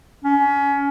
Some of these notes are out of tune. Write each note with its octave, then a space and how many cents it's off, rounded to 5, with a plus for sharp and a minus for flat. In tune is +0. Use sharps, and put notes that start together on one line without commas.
C#4 +25